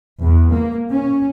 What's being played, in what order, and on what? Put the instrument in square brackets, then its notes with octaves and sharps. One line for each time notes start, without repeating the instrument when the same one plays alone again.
[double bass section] E2
A#3
C#4